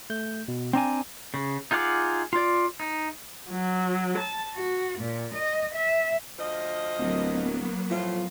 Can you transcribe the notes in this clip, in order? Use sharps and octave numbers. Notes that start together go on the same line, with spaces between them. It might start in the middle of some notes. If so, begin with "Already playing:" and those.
A3 G6
B2
C4 D4 G5 G#5 A#5
C#3
D#4 F4 G#4 F#5 D6
F4 D5
D#4
F#3
A5
F#4
A#2
D#5
E5
D2 F3 D#5
D1 F#3 A#3 B3
A2 F3 F4